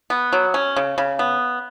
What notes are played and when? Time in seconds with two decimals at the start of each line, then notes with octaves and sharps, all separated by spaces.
0.10 B3
0.33 F#3
0.54 C#4
0.76 C#3
0.98 C#3
1.19 B3